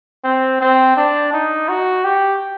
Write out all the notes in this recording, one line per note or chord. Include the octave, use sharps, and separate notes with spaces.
C4
C4
D4
D#4
F#4
G4